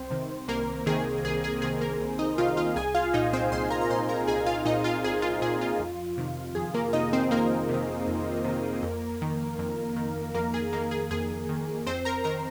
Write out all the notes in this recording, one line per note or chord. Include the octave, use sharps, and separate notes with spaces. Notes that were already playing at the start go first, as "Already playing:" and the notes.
Already playing: C2 C4 C5
C3 D#3
C2 A#3 A#4
C3 D#3 G#4
C2 G#4
G#4
C3 D#3 G#4
A#3 A#4
C2
D#4 D#5
C3 D#3 F4 F5
F4 F5
C2 G#4 G#5
F4 F5
A#2 D#4 D#5
C4 C5
C2 C5 C6
A#4 A#5
A#5
A#2 C5 C6
A#4 A#5
C2 G#4 G#5
F4 F5
A#2 D#4 D#5
F4 F5
C2 G#4
F4
A#2 G#4
F4
F2
C3 D#3
F2 G#4
A#3 A#4
C3 D#3 D#4 D#5
C4 C5
F2 A#3 A#4
C3
D#3
F2
C3 D#3
F2
D#3
F2
D#3
F2 A#3 A#4
G#4
D#3 A#3 A#4
G#4
F2 G#4
D#3
F2 C4 C5
A#4 A#5
D#3 A#4 A#5